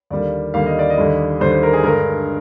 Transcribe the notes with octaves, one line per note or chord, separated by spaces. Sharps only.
D#2 D3 G3 A#3 D5
D#2 D3 G3 A#3 F5
D#5
D5
D#5
D#2 D3 G3
D#2 D3 G3 C5
C5
A#4
G#4
G2 D3 G#3 A#4